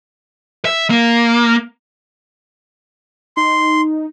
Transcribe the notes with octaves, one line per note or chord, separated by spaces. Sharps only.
E5
A#3
D#4 C6